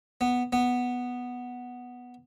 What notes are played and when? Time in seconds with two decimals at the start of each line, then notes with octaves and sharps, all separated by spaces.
0.21 B3
0.53 B3